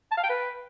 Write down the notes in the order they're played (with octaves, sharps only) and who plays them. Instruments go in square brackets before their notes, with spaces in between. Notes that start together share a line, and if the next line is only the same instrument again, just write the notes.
[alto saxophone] A5
F5
G5
B4